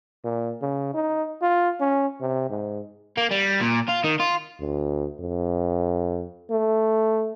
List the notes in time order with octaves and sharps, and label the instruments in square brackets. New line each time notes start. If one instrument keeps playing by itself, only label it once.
[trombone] A#2
C#3
D#4
F4
C#4
C3
G#2
[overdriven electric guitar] A#3
G3
A#2
F4
D#3
F4
[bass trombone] D2
F2
A3